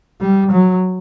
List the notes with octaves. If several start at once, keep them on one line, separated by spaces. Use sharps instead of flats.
G3
F#3